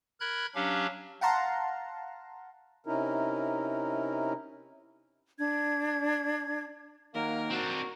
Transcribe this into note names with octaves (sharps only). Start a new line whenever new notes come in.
A#4 B5 F#6 G#6
F#3 C#4 D4 G4 F5
F5 F#5 A5 A#5 C6
C3 C#4 D#4 E4 A#4
D4 G#6
D#2 F#3 A#3 A#4
C4 D4 F#4